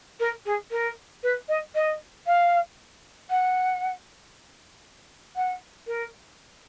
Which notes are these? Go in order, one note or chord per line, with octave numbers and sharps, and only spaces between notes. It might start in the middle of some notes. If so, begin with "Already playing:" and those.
A#4
G#4
A#4
B4
D#5
D#5
F5
F#5
F#5
A#4